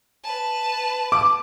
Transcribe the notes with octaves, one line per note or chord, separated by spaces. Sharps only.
B4 A5
D6